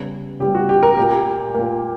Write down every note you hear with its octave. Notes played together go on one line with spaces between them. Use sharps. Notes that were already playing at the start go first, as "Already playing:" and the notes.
Already playing: C#3 G3 B3
C#3 G3 B3 G4
F#4
G4
A#4
A#2 A#3 G4
A#2 A#3